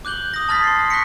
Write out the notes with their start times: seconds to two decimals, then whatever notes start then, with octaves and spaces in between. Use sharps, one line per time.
0.05 D6 F#6 G6 F#7 G7
0.34 D#6 A#6
0.49 A5 B5 F6 G#6 A6 B6
0.64 C6 C7
0.90 C#6 F#6 A#6 B6 C#7